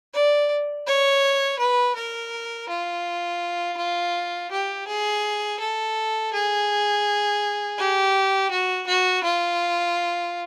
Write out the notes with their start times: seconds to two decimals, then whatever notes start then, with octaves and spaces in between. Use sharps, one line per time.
0.13 D5
0.87 C#5
1.59 B4
1.95 A#4
2.69 F4
3.77 F4
4.51 G4
4.87 G#4
5.59 A4
6.33 G#4
7.78 G4
8.51 F#4
8.87 F#4
9.24 F4